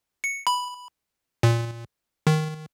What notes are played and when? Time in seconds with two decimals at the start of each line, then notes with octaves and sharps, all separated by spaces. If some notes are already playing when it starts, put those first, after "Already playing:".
0.24 C#7
0.47 B5
1.43 A#2
2.27 D#3